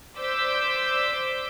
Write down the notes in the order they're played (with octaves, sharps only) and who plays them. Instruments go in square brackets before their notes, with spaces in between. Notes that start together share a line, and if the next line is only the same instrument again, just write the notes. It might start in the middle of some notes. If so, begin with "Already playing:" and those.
[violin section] C5 D5 D6 E6 G6 B6